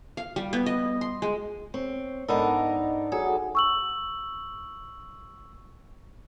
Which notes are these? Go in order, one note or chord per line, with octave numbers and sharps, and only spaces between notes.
F5
G3
B3
D#5
C6
G#3
C4 C#5
G#2 B3 D4 D#4 A4 A#4
F#3 G#4 A4
C#6 E6 F#7